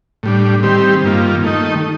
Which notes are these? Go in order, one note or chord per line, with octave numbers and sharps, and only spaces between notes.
A2 G3 D4
D#3 G3 C4 G4
G2 D#3 A#3 F4
D#3 A3 D#4